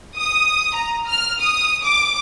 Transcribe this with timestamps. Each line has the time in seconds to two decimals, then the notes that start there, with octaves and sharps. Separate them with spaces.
0.18 D#6
0.75 A#5
1.08 F6
1.41 D#6
1.84 D6